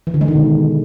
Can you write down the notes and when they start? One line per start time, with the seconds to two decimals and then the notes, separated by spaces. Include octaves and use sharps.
0.07 E3
0.14 D3
0.21 G#3
0.28 D#3
0.35 B2